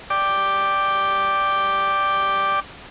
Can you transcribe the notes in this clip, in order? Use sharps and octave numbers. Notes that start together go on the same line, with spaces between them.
D5 G5 D6